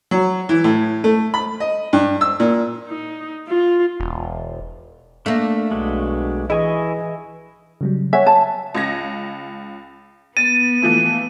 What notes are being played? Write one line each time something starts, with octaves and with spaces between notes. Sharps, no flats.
F#3
E3
A2
A3
B5
D#5
G2
E6
A#2
D#4
F4
E1
A3 A#3 D4 E5
B1 G#3 D4 F#4
E3 E4 G#4 D#5 G#5 C#6
C#3 F#3 G3
C#5 E5 F#5 G#5
A5
C#2 G#6 A#6
B3 A6 D#7
E3 F3 A3